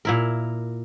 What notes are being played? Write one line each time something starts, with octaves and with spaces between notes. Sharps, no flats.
A#2 E4 A#4